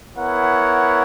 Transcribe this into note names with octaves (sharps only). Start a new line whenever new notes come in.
B3 E4 A#4 C#5 F#5